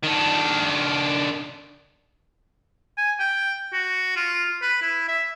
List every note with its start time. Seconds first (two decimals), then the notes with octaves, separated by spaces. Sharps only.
0.03 D#3 D4
2.98 G#5
3.19 G5
3.73 F#4
4.16 F4
4.62 B4
4.82 E4
5.08 E5